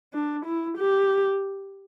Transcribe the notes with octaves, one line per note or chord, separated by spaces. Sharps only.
D4
E4
G4